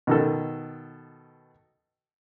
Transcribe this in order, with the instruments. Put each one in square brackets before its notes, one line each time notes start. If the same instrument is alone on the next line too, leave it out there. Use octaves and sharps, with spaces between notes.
[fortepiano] B2 D#3 A4